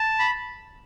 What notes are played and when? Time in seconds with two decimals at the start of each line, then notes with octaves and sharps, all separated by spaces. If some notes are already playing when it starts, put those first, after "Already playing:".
Already playing: A5
0.19 B5